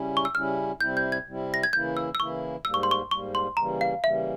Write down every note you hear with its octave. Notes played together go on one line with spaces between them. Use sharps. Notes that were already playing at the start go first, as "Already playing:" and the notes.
Already playing: C#3 G3 C#4 E4
C#6
E6
C#3 G3 C#4 E4 F6
C3 G3 C4 E4 G6
G6
G#6
C3 G3 C4 E4
A#6
G#6
C#3 E3 A#3 E4 G6
E6
E6
C#3 E3 A#3 E4 C#6
G#2 G3 A#3 E6
C#6
C6
C#6
G#2 G3 A#3 C#6
C6
C#3 E3 G3 A#3 A#5
F5
C#3 E3 G3 A#3 E5